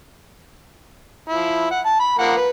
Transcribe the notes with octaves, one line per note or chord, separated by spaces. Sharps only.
F3 E4
F#5
A5
B5
F3 A#3 F#5
B4